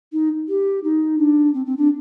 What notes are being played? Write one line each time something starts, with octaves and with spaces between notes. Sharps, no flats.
D#4
G4
D#4
D4
C4
C4
D4